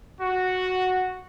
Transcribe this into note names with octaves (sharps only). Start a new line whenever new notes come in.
F#4